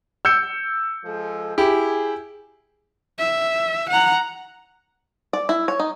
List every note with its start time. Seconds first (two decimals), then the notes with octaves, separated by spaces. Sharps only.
0.25 E6 G6 C#7
1.05 F3 G#3 A4
1.58 E4 G4 G#4
3.19 E5
3.90 F#5 A#5
5.33 D5
5.49 E4
5.68 C#5
5.79 D#4